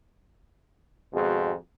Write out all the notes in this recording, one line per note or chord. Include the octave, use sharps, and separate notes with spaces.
G#1 F2 B2 G#3 F#4 G#4